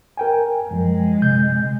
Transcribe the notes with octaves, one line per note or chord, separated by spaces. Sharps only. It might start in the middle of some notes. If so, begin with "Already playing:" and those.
A#4 G5 G#5
F#2 F3 G#3
C3 G6